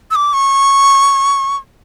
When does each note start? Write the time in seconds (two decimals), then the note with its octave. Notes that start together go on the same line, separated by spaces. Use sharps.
0.11 E6
0.15 D6
0.33 C#6